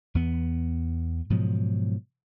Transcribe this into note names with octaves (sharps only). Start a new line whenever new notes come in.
E2 B3
G#2 B2 F3 F#3